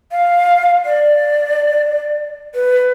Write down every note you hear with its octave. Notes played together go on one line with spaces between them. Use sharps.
F5
D5
B4